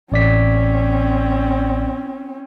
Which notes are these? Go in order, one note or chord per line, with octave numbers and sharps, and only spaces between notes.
A1 C4 C#4 D5 B6